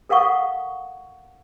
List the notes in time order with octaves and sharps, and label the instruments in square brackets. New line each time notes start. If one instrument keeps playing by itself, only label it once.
[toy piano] A4 A#4 F5 F#5 C#6 D#6